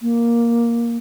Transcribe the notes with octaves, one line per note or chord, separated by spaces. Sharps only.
A#3